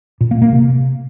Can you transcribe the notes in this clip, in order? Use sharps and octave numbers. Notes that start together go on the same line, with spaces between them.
A#2
A#3
A#3
C3